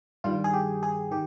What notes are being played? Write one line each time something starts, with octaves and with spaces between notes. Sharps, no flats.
G2 D#3 G3 F4
G#4
G4
G#4
D#3 G4